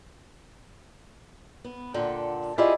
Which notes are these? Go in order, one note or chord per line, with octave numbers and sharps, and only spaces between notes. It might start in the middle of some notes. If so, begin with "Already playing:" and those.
B3
A#2 D3 A4 F#5 G5
E4 F4 G4 G#4 D5 D#5